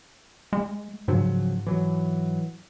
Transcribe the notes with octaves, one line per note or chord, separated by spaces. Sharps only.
G#3
G#2 C#3 F3 F#3
E3 F#3